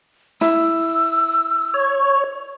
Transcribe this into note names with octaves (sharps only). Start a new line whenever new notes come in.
E4 E6
C#5